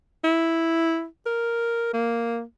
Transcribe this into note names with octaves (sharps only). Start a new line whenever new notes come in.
E4
A#4
A#3